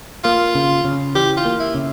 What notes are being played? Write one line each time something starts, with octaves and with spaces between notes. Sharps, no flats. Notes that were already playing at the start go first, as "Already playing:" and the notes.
A#3 F4
C#3
C#3
E3 G4
F4
A#3
E4
C#3